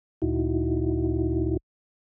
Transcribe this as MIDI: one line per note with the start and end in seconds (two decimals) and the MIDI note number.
0.22 1.57 38
0.22 1.57 46
0.22 1.57 63
0.22 1.57 64
0.22 1.57 66